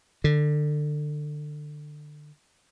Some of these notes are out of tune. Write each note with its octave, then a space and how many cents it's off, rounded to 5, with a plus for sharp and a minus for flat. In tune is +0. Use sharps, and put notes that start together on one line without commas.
D3 +25